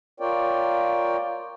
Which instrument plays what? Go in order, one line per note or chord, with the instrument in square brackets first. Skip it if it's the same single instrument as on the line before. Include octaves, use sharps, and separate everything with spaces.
[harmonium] F4 A#4 C#5 D5 G5